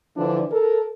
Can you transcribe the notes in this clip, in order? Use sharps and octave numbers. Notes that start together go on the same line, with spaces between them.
D3 E3 F3 D4
A4 A#4